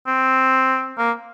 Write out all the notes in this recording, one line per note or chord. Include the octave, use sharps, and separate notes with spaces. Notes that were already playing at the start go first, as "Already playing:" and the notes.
C4
A#3